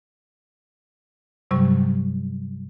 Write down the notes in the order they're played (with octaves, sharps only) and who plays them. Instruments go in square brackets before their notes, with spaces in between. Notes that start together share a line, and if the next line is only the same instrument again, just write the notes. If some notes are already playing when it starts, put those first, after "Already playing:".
[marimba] G2 C3 F#3 G3 C#6